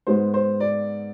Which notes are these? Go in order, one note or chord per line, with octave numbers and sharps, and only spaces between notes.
G#2 G#3 B3 C5
C5
D5